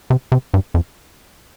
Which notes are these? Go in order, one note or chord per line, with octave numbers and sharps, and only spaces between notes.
C3
C3
G2
F2